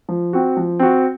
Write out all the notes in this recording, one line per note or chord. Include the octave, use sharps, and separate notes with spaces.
F3
C4 F#4
F3
C4 F#4